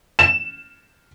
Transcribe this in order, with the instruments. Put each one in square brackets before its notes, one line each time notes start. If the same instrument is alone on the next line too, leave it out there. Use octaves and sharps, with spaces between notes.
[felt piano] E7